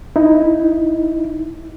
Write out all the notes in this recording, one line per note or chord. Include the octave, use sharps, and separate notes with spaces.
D#4 E4